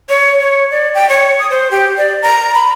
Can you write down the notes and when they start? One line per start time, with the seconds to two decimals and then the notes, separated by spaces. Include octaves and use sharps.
0.09 C#5
0.40 C#5
0.71 D5
0.95 G5
1.09 C#5
1.39 D#6
1.51 C5
1.71 G4
1.98 D5
2.23 A#5
2.55 B5